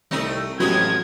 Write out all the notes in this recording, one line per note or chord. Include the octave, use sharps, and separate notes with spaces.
C2 A3 C4 D#4
A1 F3 F#3 G#3 B3 G4 G#6